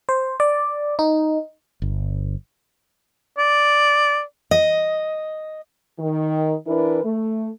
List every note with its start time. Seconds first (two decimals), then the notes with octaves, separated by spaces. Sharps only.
0.09 C5
0.40 D5
0.99 D#4
1.82 G1
3.38 D5
4.51 D#5
6.00 D#3
6.67 E3 D4 E4 A#4 B4
7.04 A3